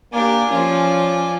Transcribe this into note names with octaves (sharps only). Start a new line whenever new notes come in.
A#3 D4 G4 D5 G#5
F3 C#4 F4